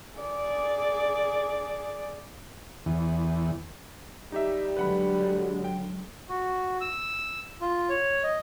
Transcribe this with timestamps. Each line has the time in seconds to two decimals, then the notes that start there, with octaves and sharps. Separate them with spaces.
0.20 G#4 D5
2.86 E2
4.32 G3 D#4 G4 E5
4.77 D3 F#3 G#3 B4 F#5 B5
5.64 G5
6.29 F#4
6.81 E6
7.61 F4
7.89 C#5
8.23 D#5